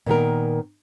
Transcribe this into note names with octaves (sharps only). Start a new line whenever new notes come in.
A#2 D#3 B3 A#4